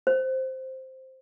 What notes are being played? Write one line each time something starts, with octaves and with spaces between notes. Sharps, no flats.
C5